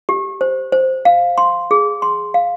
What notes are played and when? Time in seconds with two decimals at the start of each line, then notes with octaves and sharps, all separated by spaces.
0.09 G4
0.41 C5
0.72 C5
1.05 F5
1.38 C6
1.71 G#4
2.02 C6
2.34 F5